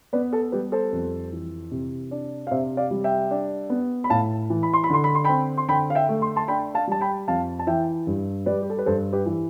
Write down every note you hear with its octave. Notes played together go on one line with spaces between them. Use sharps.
B3 B4 D5
A4
G3 G4 B4
A4 C5
F2
E3
C3
D4
F5
C3 C5 E5
D5 F5
G3
E5 G5
D4
B3
B5
A2 F5 A5
E3
B5
C6
B5
D3 C6
B5
C6
C4 G5 B5
C6
D3 G5 B5
F5
E5 G5
A3
C6
A5 C6
D4 G5 B5
F5 A5
G3 A5
G5 B5
F2 F5 A5
A5
E3 E5 G5
G2
G3 B4 D5
G4
A4
B4
G2 A4 C5
G4 B4
E3